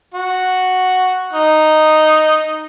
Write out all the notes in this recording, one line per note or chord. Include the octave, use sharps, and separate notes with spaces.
F#4
D#4